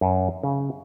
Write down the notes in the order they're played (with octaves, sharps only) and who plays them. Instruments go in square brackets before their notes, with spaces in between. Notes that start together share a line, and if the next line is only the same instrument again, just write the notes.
[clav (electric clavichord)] F#2
C#3